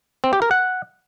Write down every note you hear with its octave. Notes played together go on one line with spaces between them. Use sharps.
C4
G4
A#4
F#5